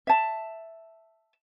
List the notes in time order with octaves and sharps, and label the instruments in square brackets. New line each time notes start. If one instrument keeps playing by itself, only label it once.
[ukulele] E5 A5